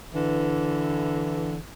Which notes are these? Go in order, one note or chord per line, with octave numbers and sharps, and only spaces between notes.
D3 E3